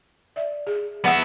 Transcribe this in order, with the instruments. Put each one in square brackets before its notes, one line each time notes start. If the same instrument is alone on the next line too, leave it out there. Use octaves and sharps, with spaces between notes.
[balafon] D5 E5
G#4
[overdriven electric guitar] B3 E5 [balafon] F#5